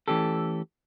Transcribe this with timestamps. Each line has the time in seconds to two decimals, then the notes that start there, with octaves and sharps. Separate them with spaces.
0.08 E3 A3 C#4 G4 A4